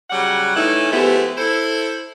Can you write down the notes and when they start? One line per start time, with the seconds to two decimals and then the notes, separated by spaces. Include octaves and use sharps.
0.10 C#3 F#3 G3 F#5
0.55 E3 A3 C#4 D#4 E4
0.91 F3 G#3 A3 B3 E4 G4
1.37 E4 A4 C5